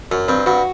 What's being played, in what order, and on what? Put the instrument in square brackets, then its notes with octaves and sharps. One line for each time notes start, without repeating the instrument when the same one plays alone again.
[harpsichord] F#2 [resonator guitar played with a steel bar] F#3
[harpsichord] G2 [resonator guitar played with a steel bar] C4
[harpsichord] G2 [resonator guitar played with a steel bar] F#4